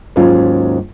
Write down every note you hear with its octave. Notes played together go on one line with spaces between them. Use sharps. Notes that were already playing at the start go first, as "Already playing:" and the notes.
D#2 G#2 F#3 C#4 F4